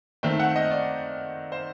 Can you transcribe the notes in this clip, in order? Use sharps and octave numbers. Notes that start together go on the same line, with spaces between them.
D#3 A3 C4 G5
F#5
D#5
D5
C5